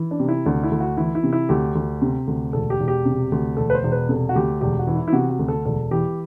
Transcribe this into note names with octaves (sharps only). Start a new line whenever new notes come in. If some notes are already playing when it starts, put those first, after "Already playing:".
Already playing: E3
D4
C3
E4
D2 D4
E4
D2
F#4
E3 E4
E4
C3
E4
D2 G4
D2
C3
D2
E1 A4
G4
E1
G4
C3
D2
E1 A4
B4
C5
E1
B4
C3 A4
F#4
D2 G4
E1 G4
F#4
E3
E4
E4
C3 F#4
F#4
D2
A4
E1 A4
E3 G4